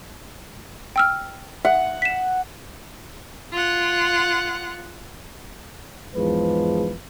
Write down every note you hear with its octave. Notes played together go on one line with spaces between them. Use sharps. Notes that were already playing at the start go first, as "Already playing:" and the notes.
G5 E6 F6
E5 F#5
B6 E7
F4 F#5
E2 G#2 F3 G#3 B4